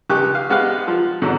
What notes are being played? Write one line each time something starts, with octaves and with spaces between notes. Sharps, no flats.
C#2 G4 C#6 F#6
F5
G#3 B3 G4 F5
F3
G#2 B2 D3 F#3